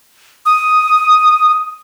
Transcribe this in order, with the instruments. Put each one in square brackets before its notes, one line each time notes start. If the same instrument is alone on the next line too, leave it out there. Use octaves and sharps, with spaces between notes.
[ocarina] D#6